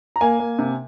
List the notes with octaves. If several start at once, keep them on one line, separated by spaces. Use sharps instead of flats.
A#5
A#3 G#5
A#3
C3